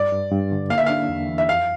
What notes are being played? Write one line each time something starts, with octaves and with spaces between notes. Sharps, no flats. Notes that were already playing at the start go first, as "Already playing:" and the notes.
Already playing: G2 D5
G2
G2
D3
A#3 F5
E5
D4 F5
E2
E3
E5
F2 F5